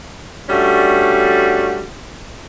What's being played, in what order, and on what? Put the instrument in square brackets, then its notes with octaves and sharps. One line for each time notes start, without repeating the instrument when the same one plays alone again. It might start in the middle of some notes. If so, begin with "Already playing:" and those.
[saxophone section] G3 A3 C#4 D4 F#4